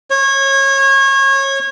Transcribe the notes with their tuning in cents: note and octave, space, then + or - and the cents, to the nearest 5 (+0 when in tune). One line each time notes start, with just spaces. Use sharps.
C#5 -25